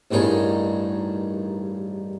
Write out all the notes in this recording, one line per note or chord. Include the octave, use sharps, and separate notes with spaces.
A1 G2 D#3 G#4 C#5